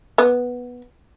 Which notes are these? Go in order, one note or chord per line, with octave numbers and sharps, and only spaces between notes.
B3